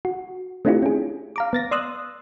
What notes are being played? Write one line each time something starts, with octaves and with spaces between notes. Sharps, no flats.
F#4
A3 C4 D4 E4 F4 G4
C#4 G#4
F5 A#5 D6
B3 A6 A#6
D5 C6 D#6 E6 F#6